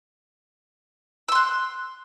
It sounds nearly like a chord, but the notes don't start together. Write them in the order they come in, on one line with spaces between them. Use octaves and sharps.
E6 C6 F#6